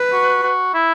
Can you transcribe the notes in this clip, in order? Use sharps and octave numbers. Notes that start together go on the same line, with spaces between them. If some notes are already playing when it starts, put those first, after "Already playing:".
Already playing: B4
F#4
F#4
E4